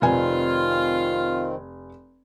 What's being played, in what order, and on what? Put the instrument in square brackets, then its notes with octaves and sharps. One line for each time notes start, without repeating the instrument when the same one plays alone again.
[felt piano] F1 G#5 [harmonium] D#3 C4 [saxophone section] F4